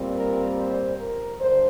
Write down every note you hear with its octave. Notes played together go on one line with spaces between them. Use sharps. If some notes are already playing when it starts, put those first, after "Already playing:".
Already playing: A#2 G3 C4
A#4
C5
A#4
G2 D3 C5